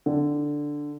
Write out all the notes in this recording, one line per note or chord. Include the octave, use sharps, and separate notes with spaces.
D3